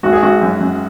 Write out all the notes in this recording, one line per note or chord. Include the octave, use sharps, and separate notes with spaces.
G#1 F#4
G#4
G#1 F#4
F#2
F#2